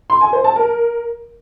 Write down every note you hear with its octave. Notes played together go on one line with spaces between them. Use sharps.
C6
G#5
C5
A5
A#4